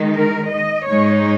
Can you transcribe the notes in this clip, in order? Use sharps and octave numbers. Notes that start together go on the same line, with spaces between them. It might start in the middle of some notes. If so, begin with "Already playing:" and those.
Already playing: D#3 G#3 D#4
A#4
D#5
G#2 G#3 D#4 C#5